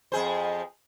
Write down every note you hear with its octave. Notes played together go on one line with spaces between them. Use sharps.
F2 G#4 C5